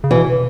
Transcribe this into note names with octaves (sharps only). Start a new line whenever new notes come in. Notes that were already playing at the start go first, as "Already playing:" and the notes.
C#3
B2 E3